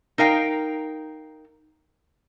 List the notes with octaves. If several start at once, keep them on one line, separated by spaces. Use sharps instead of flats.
D#4 A#4 F5 G5